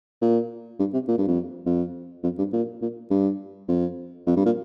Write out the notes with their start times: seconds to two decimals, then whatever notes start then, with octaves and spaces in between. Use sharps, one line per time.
0.21 A#2
0.79 G2
0.93 C3
1.08 A#2
1.18 G2
1.27 F2
1.66 F2
2.23 F2
2.38 G2
2.53 A#2
2.82 A#2
3.11 G2
3.68 F2
4.27 F2
4.36 G2
4.45 A#2